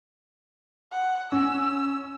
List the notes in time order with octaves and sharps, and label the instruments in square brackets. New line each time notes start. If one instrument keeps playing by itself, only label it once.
[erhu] F#5
[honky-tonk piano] C#4 [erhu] E6